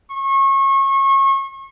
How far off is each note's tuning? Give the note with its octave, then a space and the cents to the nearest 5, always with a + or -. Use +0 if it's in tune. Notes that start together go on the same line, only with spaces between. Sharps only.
C#6 -30